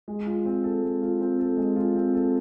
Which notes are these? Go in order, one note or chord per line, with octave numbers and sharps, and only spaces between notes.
G#3
F4
C4
A4
G#3
F4
C4
A4
G#3
F4
C4
A4